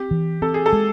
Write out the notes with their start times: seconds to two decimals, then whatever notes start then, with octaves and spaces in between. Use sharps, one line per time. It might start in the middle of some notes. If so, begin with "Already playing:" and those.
Already playing: C4 G4
0.11 E3
0.42 C4 A4
0.54 G#4
0.66 A4
0.73 G#3